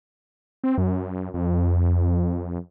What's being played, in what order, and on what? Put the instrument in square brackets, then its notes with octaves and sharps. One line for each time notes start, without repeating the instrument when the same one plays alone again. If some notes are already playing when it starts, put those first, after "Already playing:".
[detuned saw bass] C4
F#2
F2